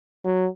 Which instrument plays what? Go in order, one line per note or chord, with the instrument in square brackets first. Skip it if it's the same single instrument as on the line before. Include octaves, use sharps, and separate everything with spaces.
[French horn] F#3